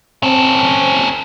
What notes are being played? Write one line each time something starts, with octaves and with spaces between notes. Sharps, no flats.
C4 C#4 A4